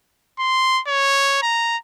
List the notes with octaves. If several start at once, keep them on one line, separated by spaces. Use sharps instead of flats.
C6
C#5
A#5